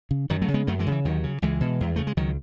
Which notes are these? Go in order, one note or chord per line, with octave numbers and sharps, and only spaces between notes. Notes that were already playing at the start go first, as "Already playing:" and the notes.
C#3
F#2 D#3 F#3
F#3 A3
C#3
G#3 B3
F#2 F#3 A3
E3 G#3
C#3
E3
D#2 D#3 F#3
C#3
C#2 E3 G#3
B2
E2
C#3 A3
G#3
C#2 D#3 F#3